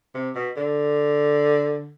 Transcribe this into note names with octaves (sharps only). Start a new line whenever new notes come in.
C3
B2
D3